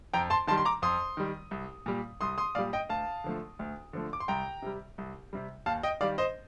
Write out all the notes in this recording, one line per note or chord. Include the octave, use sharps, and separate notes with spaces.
F2 G5 A#5
A5 C6
D#3 G3 A5 C6
C6
A#5 D6
F2 C6 D#6
D#3 G3
C2
A#2 G3
C2 C6 D#6
C6 D#6
A#2 G3 D5 F5
D#5 G5
D2 F5 A5
D3 F3 A3
D2
D3 F3 A3
D6
C6
C2 G5 A#5
C3 G3
C2
C3 G3
D#2 F5 A5
D#5 G5
D#3 G3 D5 F5
C5 D#5